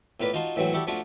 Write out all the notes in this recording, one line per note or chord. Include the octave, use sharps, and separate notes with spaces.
A2 A#3 F4 B4 D5
D#4 F4 F#4 A5 C6
A2 E3 F#3 C4 F#4
E4 F#4 G4 A4 D5
F3 A3 D4 F4 F#4